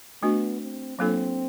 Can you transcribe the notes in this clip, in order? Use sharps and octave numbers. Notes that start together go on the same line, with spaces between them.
A3 B3 D4 F#4
C4
F#3 A#3 C4 D4 F4 A4